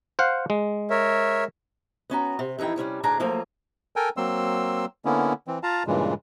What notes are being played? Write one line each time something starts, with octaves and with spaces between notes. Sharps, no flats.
C5 F5 F#5
G#3
A#4 C#5 E5
B3 C#4 F#4 A#5
C3
F2 E3 D#4 E4 G5
C3 G3 C#4 D4
D2 A2 D4 G#4 A5 A#5
F3 F#3 A3 A#3 F4
A4 A#4 G5 G#5
F#3 A#3 C4 C6 E6
D3 A#3 B3 C#4 E4
E3 C4
F4 F5 A5 A#5
G2 A#2 C#3 E3 G#3